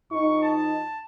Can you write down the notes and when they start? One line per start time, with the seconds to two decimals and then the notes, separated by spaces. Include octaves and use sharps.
0.11 F2 D#4 C#6
0.43 A5